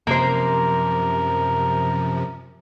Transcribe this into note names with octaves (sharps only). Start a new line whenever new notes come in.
F#2 C3 F3 A#3 A#4 C5